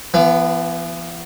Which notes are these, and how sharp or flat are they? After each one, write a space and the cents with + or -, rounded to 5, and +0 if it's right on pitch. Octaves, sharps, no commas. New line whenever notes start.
E3 +45 B3 +0